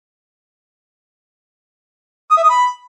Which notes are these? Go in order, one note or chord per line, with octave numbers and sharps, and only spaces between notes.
D#6
E5
D#6
B5